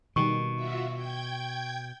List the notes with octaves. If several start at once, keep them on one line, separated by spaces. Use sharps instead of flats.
B2 D#3 G3 C#6
F4 F#4 E5
G5 G6 G#6